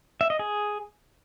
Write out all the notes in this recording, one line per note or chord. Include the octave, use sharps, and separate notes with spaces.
E5
D#5
G#4